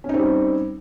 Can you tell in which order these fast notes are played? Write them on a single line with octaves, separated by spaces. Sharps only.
C#4 D#4 C4 G3